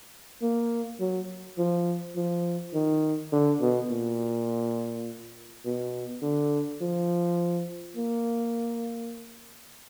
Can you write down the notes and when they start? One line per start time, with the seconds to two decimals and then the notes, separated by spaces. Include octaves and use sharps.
0.42 A#3
1.00 F#3
1.58 F3
2.16 F3
2.74 D#3
3.32 D3
3.61 B2
3.90 A#2
5.65 B2
6.22 D3
6.81 F3
7.97 A#3